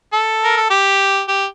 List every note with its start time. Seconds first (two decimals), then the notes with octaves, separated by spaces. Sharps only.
0.13 A4
0.44 A#4
0.57 A4
0.70 G4
1.28 G4